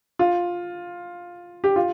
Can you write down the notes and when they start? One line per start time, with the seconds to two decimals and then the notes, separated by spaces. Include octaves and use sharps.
0.19 F4
1.64 G4
1.76 F4